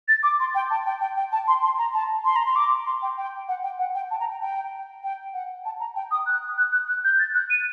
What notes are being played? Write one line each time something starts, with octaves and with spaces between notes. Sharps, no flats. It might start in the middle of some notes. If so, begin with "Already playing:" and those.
A6
D6
C6
G5
A5
G5
G5
G5
A5
C6
C6
A#5
A5
C6
A#5
C6
D6
C6
G5
G5
F#5
G5
F#5
G5
A5
A#5
G5
G5
G5
F#5
A5
A#5
G5
D#6
F#6
F#6
F#6
F#6
G6
A6
F#6
D#7